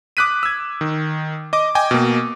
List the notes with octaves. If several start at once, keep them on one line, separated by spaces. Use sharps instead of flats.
D6 D#6 F#6 B6 D#7
E6 G#6
D#3
D#5 D6
D#5 G5 G#5 D6
B2 A#3